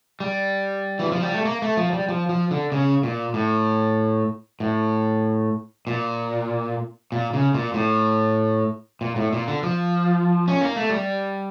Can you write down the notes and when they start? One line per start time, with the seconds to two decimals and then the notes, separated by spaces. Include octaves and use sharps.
0.20 G3
0.99 E3
1.12 F3
1.23 G3
1.34 A3
1.45 A#3
1.62 A3
1.77 F3
1.93 G3
2.08 F3
2.29 F3
2.51 D3
2.72 C#3
3.03 A#2
3.34 A2
4.60 A2
5.87 A#2
7.12 A#2
7.33 C#3
7.54 A#2
7.74 A2
9.01 A#2
9.16 A2
9.33 A#2
9.48 D3
9.63 F3
10.48 C#4
10.61 A#3
10.76 A3
10.89 G3